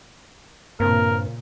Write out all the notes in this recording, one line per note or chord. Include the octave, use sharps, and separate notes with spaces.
G2 A#2 C#3 A#3 C4 A#4